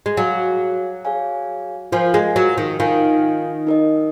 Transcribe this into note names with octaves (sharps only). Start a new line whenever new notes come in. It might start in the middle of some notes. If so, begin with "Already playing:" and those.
G#3
F#3 G#4 C#5 F5 G#5
G#4 C#5 F5 G#5
F3 F4 A#4 F5 G#5
G#3
F#3
D#3
D#3 F4 A#4 F5 G#5
D#4 A#4 D#5